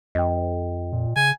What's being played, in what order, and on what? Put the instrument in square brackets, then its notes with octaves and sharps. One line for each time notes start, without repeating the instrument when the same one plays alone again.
[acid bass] F2 [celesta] D#5 G5
[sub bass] A#2
[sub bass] C#3 [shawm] G#5